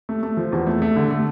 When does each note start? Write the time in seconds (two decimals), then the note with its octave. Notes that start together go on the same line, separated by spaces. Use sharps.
0.09 A3
0.23 A3
0.37 F3
0.52 E2
0.67 A3
0.82 A3
0.96 D3
1.11 A3